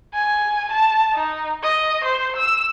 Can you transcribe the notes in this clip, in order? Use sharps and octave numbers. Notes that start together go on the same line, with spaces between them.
G#5
A5
D#4
D#5
C5
E6